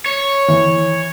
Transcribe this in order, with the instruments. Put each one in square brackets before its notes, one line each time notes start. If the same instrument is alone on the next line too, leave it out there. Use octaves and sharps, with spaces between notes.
[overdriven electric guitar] C#5
[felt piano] E3